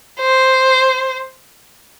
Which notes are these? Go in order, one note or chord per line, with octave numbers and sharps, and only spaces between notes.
C5